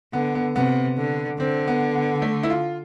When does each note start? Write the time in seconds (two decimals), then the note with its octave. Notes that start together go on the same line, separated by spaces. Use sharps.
0.13 D3 B3
0.35 B3
0.56 C3 B3
0.97 D3
1.39 D3 C4
1.67 B3
1.95 B3
2.22 A3
2.43 E4
2.50 F4